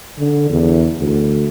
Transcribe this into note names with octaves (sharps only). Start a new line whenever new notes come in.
D3
E2
D2